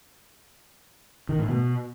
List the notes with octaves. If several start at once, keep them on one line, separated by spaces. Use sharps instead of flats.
D#3
A2
B2